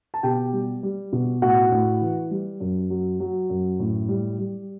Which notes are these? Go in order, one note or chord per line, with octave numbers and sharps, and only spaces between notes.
A5
B2 G4 G5
G3
G3
B2
A2 F#4 F#5
A2
E3
G3
F#2
F#3
F#3
F#2
A2
G3
G3